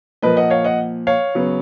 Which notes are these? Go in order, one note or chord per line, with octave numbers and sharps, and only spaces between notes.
A#2 F3 A#3 B4 D#5
D#5 F#5
C#5 F5
D#5 F#5
C#5 F5
C#3 F#3 B3